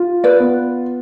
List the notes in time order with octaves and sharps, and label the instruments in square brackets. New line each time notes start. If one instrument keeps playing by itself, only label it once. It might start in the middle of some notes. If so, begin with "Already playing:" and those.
Already playing: [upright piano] F4
[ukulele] B4 D5
[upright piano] B3